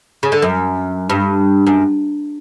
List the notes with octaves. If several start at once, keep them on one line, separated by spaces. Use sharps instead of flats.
C#3
D3
F#2
G2
F#2